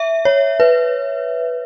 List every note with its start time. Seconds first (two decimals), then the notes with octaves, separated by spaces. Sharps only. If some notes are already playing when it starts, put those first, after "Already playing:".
Already playing: E5
0.25 C#5
0.60 B4